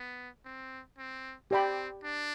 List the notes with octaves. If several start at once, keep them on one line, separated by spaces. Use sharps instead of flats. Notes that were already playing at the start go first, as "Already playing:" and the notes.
Already playing: B3
C4
C4
C4 G4 D5 G5 B5
D4